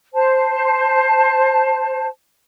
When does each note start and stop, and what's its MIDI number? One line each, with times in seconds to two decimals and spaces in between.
0.13 2.05 72
0.13 2.05 81